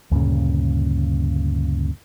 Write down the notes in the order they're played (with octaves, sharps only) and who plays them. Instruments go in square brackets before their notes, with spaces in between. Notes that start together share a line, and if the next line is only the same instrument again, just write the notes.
[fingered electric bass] D2 G2 A#2 C#3